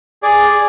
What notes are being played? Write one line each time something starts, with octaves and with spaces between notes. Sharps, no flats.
G#4 D5
G#4